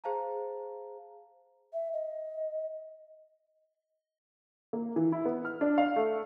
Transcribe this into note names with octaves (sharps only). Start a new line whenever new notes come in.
G#4 C5 F5 A5 A#5
E5
D#5
A#3
E3
E4
B3
F6
D4
F5
A3